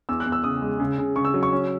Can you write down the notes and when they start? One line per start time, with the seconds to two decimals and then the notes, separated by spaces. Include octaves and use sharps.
0.09 E2 E6
0.20 F#6
0.26 E2
0.32 E6
0.44 C#3 D#6
0.62 G#3
0.80 C#3
0.98 C#3
1.16 C#3 C#6
1.25 E6
1.34 F#3
1.43 C#6
1.52 C#4